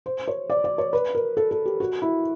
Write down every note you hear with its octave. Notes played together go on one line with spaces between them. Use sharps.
C5
C#5
D5
D5
C#5
B4
A#4
A4
A4
G4
F#4
E4